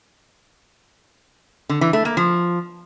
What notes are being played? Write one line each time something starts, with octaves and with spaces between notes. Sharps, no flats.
D3
E3
A3
A#3
F3